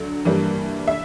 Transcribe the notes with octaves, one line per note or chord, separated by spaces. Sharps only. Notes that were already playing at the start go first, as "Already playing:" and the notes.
Already playing: D2 D3 F#3
G2 E3 G3 A#3
E5